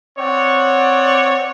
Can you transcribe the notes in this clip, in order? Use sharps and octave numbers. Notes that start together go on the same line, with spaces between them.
C4 C#5 D5 F#5